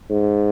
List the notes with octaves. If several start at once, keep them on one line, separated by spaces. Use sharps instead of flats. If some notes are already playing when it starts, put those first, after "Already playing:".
G#2